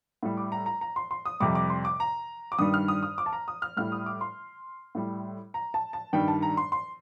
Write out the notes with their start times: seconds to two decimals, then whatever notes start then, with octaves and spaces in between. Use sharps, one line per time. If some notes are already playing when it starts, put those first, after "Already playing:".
0.23 A2 G3
0.37 D6
0.52 A#5
0.66 A#5
0.81 A#5
0.96 C6
1.11 C6
1.25 D#6
1.40 F2 C3 G3 D6
1.55 D6
1.70 C6
1.85 D6
2.00 A#5
2.52 D6
2.58 G2 D#3 G3 D#6
2.74 F6
2.88 D#6
3.03 D#6
3.18 D6
3.26 A5
3.33 A#5
3.48 D#6
3.62 F6
3.77 A2 G3 F6
3.92 D#6
4.06 D6
4.21 C6
4.95 A2 G3
5.54 A#5
5.74 A5
5.93 A5
6.13 G2 D#3 G3 G5
6.28 A5
6.42 A#5
6.57 C6
6.72 C6